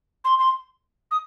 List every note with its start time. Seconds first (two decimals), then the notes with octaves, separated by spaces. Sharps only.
0.25 C6
0.39 C6
1.11 D#6